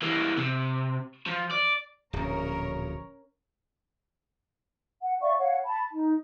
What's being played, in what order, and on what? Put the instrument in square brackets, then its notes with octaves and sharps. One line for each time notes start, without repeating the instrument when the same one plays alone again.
[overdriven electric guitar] E3 A#3
C3
F3
D5
[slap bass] D1 A#1 [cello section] C#4 A#4 C#5
[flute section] F#5
D5 E5 F5 C#6
C#5 F5 F#5
A5 B5
D#4